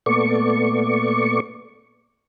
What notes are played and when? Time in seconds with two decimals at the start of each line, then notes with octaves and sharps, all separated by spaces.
0.06 A#2 A3 B3 D5 C#6